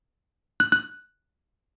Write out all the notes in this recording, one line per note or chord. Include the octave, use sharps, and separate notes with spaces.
F#6
F#6